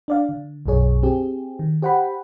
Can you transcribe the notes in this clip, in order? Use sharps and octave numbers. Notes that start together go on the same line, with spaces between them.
D4 D5 F5
D3
B1 F#2 B2 G#4 C#5
C4 G4 G#4
D#3
G4 C5 F#5 G5 B5